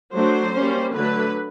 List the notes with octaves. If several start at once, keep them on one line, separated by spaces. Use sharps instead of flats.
F#3 A3 D4 C5
G3 A#3 C#4
D3 F#3 A3 B4